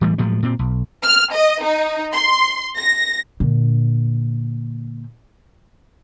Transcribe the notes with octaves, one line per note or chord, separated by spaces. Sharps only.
A2 E3 G3 G#3
A2 F3 F#3 G#3
A#2 C4
B1
F6
D#5
D#4
C6
A#6
A#2 D3